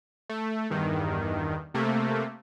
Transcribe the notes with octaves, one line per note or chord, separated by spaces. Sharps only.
A3
E2 G2 D#3
C3 A3 A#3